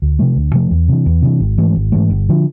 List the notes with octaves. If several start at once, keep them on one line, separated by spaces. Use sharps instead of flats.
D2
C3 F3 A3
D2
C3 F3 A3
E2
C3 E3
E2
C3 E3
G#1
G#2 E3 A3
G#1
G#2 E3 A3
G1
D3 F3